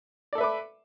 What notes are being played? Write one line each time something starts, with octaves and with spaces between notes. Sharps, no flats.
A4 B4 D5 E5 D6